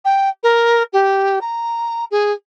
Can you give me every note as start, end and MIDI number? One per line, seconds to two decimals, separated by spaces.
0.05 0.29 79
0.43 0.83 70
0.93 1.39 67
1.41 2.04 82
2.11 2.32 68